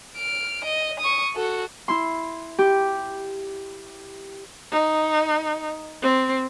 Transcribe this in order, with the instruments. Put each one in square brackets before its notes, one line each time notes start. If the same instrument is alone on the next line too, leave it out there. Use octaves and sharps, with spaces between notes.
[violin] F6 D7
D#5
C#6 D#6
F#4 A4
[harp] E4 C6
G4
[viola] D#4
C4